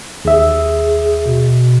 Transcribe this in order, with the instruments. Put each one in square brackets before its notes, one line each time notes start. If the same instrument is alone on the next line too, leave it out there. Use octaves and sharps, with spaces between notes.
[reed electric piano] D#2 E5 [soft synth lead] G#4
[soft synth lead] B2